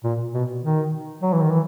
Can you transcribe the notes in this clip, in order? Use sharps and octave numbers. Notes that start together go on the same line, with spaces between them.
A#2
B2
D#3
F#3
E3
D#3
E3